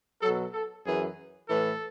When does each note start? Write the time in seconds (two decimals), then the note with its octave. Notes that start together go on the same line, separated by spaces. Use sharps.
0.22 B2 F#3 A4
0.53 A4
0.85 F#2 E3 G#4
1.49 A2 E3 A4